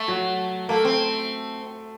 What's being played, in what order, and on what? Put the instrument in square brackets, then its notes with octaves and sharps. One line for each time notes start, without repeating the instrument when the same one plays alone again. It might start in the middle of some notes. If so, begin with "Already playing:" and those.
Already playing: [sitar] A3
[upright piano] F#3 F#4
[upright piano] A3 A4 [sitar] A#3
[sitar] C4